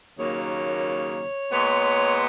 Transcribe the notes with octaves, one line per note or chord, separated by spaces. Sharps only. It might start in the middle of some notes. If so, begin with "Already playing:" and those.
D#2 C#3 F#3 A#3 C#5
A#2 G#3 B3 C#5